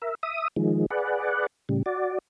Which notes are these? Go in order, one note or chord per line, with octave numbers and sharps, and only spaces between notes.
A#4 E5
E5 D#6
D#3 F3 G#3
G#4 B4 D5 F#5
A2 C#3 G3
F#4 D5